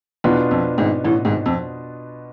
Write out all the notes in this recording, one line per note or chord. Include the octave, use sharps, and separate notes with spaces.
E2 B2 B3 D4 F4
F2
G#1 G#2
A1 A2
G#1 G#2
F2